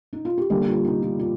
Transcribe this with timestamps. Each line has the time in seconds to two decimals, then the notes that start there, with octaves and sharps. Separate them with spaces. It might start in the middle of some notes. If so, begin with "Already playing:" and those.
0.13 D#4
0.25 F4
0.38 G4
0.50 D3 G3 A#3 A4
0.67 F4
0.85 D#4
1.02 F4
1.19 F4